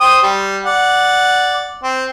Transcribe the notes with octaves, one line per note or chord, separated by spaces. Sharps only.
C5 G5 D#6
G3
D5 F#5
C4